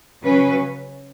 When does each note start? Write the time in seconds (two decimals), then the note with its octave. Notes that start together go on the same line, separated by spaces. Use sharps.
0.24 C#3 F#3 C#4 B4